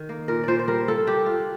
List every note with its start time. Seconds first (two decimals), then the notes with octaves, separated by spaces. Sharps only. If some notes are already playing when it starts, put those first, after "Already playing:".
Already playing: D#3
0.09 A#3
0.28 A#2 A#4
0.44 A#2 C5 D5
0.59 C5
0.68 G3 A#4
0.88 F4 A4
1.07 D4 G4
1.26 F4